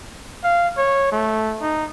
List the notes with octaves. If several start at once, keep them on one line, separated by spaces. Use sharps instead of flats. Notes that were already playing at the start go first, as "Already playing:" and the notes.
F5
C#5
A3
D#4